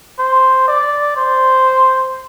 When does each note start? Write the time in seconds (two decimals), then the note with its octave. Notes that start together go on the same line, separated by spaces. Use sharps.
0.18 C5
0.67 D5
1.16 C5